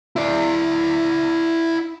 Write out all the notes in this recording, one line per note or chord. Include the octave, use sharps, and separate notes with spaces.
E4 D5